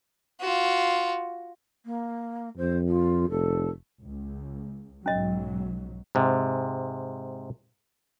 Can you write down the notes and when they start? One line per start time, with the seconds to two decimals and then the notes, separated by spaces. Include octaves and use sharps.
0.40 F4 F#4
1.85 A#3
2.57 F2 C5
2.88 F4
3.30 F1 A4
4.04 C#2
5.06 B1 G#2 F#3 C#4 D#5
6.15 G#2 C3